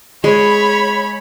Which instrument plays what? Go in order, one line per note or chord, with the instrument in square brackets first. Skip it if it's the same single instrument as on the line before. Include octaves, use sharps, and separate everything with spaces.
[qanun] G#3 [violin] C#5 B5